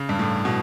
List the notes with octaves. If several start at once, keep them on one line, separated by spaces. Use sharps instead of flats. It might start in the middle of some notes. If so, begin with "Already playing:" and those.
Already playing: C#3
G2
A2
B2